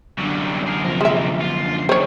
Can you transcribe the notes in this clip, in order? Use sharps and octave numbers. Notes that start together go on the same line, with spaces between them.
F#2 D3 F#3 G3
G#4 A#4
C3 F3 A#4
G#3 E5
F4
D2 D#3 C5 C#5